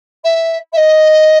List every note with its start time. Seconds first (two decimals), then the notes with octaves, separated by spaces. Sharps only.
0.24 E5
0.72 E5
0.77 D#5